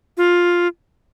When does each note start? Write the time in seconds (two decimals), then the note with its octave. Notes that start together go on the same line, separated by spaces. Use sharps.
0.17 F4